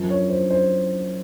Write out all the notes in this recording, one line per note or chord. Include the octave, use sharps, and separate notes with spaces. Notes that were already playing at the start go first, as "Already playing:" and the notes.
Already playing: F#2 F3
C#5
C5
C5